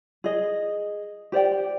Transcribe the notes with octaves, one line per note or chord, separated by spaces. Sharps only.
G#4 D#5
G4 C5 D5 G5